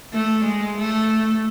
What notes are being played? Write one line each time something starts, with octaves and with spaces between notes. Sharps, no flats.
A3
G#3
A3